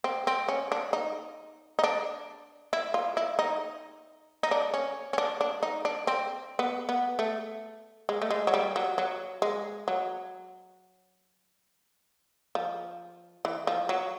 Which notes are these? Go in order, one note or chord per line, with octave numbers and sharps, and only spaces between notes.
C4
C4
C#4
D4
D#4
D#4
D4
E4
F4
E4
D#4
D#4
D4
C#4
C#4
D4
D4
D#4
D4
C4
B3
B3
A3
G#3
A3
G#3
F#3
G3
F#3
F#3
G#3
F#3
F3
E3
F3
F#3